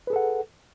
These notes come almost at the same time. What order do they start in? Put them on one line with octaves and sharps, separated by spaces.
B4 G#4 A4 F#5